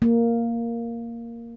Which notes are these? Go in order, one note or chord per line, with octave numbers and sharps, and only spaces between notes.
A#3